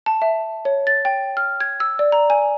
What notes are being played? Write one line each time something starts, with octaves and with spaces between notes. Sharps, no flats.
A5
E5
C#5
A6
G5
F6
G#6
E6
D5
A#5
G#5